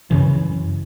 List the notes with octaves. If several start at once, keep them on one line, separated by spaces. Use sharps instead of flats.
F#2 C#3 E3